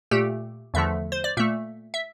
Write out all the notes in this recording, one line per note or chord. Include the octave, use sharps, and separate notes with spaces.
A#2 A3 G4
E2 D3 F3 A3 E5
C5
D5
A#2 A3 E5
E5